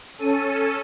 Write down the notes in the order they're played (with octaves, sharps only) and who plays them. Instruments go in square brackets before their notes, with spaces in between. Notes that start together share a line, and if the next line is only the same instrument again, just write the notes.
[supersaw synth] C#4 A4 D#7